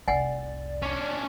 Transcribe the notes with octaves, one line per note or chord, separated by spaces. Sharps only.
F1 C2 D5 F#5 G#5
C#4 D4